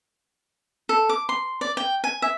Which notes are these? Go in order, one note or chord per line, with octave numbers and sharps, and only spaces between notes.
A4
D6
C6
D5
G5
G#5
E5